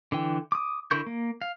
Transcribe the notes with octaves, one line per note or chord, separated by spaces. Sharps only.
D3 E3 G5
D6 D#6
D3 E4 A#4 C#6 G6
A#3
F5